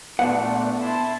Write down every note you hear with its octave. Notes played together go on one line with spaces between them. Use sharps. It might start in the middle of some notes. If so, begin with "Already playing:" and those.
A#2 A3 B3 D4 F#5
E4 A5 B5 C6